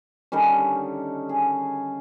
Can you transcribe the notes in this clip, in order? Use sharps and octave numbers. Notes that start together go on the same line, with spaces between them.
D3 D#3 G3 C#4
G#4